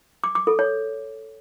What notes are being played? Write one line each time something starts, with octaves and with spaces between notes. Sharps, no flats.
D6
D6
A4
C#5